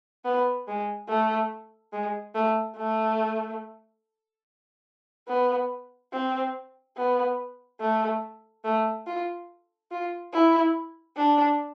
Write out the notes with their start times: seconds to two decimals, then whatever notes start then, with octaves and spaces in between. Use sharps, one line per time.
0.25 B3
0.67 G#3
1.08 A3
1.93 G#3
2.35 A3
2.76 A3
5.28 B3
6.13 C4
6.97 B3
7.80 A3
8.64 A3
9.06 F4
9.91 F4
10.33 E4
11.17 D4